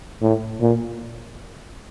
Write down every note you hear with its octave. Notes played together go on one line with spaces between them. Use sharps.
A2
A#2